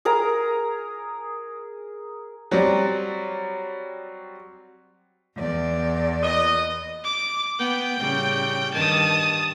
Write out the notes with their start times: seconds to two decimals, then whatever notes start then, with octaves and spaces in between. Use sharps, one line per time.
0.05 G#4 A#4 A#5
2.51 F#3 G3 C4 D5
5.36 E2 D5
6.22 A#2 B4 D#5
7.04 D6
7.59 B3 G5
7.98 A2 C#3 G3
8.74 G2 D#3 A5 D#6